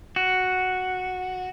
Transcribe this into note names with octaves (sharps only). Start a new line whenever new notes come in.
F#4